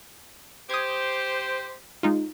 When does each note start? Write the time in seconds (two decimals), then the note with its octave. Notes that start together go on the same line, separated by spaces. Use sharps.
0.70 G4 C5 D#6 G#6
2.03 G#3 D#4 F4